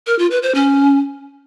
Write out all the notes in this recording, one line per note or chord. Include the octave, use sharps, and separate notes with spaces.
A#4
F4
B4
C5
C#4